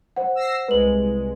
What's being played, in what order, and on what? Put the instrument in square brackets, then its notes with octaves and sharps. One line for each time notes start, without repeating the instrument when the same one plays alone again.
[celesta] C5 F#5
[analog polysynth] E6 A#6 C7
[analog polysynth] C2 G#3 [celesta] B4 F#7